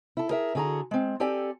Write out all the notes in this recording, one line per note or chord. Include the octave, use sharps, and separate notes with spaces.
E4 A4
G#4 A#4 E5
D3 F#4 G#4 A4 A#5
G#3 C4
C4 G4 A4 D5 G#5